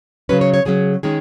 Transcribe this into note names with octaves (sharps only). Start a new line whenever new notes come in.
C#3 F#3 C#4 B4
C#5
C#5
C#3 F#3 C#4 G#4
D#3 G#3 C#4 G#4